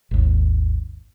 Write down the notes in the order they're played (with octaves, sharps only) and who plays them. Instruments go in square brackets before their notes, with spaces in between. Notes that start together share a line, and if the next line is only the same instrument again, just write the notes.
[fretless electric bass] G#1 D#2